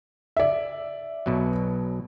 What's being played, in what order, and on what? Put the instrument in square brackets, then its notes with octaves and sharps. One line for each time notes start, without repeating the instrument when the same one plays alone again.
[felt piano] D5 E5
[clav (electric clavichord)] B1 B2 F#3